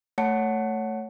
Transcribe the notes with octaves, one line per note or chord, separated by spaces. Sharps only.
A3 C#5 F#5 A5 C#7